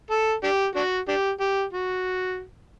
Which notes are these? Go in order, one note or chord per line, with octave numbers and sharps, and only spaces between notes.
A4
D4 G4
D4 F#4
D4 G4
G4
F#4